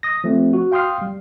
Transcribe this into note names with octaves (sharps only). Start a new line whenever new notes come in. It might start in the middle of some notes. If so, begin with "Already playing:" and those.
D#6 A#6
F3 A3 C4
F#4
F5 G5 C6 D#6 F6 C7
G3